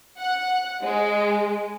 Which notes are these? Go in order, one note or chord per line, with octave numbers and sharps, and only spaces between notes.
F#5
G#3